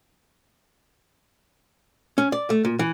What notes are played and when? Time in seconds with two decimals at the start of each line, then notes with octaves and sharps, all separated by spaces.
2.18 C#4
2.32 D5
2.50 A3
2.65 A#2
2.79 E3